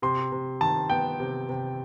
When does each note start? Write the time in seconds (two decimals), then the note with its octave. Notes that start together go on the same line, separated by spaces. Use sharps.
0.02 C3 C6
0.32 C3
0.61 D#3 A5
0.90 B3 G5
1.20 C3
1.49 C3